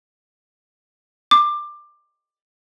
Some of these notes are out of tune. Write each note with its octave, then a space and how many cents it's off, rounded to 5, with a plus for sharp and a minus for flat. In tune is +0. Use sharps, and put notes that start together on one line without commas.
D6 +20